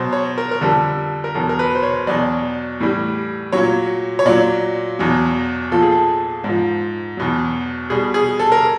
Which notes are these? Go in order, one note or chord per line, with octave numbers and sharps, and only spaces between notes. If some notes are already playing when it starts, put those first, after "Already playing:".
Already playing: B2 F#3 C5
C#5
A#4
A#4
F2 D3 G3 A4
A#4
E2 B2 F#3 A4
A#4
B4
C5
C#5
E2 B2 F#3 D5
A2 E3 G3
A#2 F#3 C#5
C#5
A#2 F#3 D5
E2 B2 F#3
A#2 F3 A4
G#4
A4
G#2
F3
E2 B2 F#3
B2 G3 G#4
G#4
A4
A#4